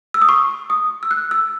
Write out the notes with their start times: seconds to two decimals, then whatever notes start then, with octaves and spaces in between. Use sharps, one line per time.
0.14 E6
0.22 D#6
0.29 C#6
0.70 D#6
1.03 E6
1.11 F#6
1.31 E6